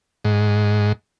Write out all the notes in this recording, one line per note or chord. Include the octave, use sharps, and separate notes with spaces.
G#2